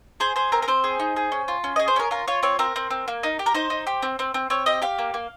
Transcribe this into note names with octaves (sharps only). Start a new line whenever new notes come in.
G#4 C5
G#4 C5
C4 A#4
A#4
C4 C5
G#4
D#4
G#4
C#4
F4
C#4
G#4 D#5
C5
C#4 A#4
F4 A#4
F4 C#5
C4 C#5
C4 A#4
C4
C4
A#3
D#4
G4
A#4
D#4 C5
D#4
G4
C4
C4
C4
C4 C#5
G4 D#5
G4 F5
A#3
A#3